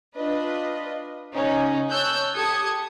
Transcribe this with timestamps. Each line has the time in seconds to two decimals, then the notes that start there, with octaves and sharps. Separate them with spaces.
0.15 D4 F4 B4 D#5
1.34 C#3 C#4 D#4
1.91 C#5 A5 E6 F#6 G6
2.34 G4 A4 D#6 G#6 C#7